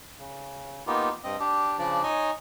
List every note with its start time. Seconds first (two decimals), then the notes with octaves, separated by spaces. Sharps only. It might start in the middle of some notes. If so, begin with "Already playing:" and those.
0.18 C#3
0.87 A#3 B3 D#4 F4 G4
1.24 G2 C4 D#5
1.40 D4 G4
1.79 C#3 F3 D4 D5
2.03 D#4 C#5 D#5 G#5